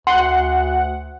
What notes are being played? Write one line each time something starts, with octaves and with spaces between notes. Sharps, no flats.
D2 F#5 C6